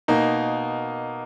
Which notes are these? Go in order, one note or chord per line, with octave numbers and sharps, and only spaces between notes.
B2 A#3 D#4